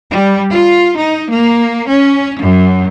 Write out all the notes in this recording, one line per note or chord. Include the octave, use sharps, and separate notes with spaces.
G3
F4
D#4
A#3
C#4
F#2